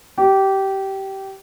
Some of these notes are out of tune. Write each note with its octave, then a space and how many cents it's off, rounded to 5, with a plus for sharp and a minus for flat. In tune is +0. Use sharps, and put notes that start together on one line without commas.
G4 -20